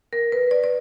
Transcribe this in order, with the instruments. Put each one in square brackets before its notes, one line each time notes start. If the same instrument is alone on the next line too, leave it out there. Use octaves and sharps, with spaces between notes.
[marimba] A#4
B4
D5
D5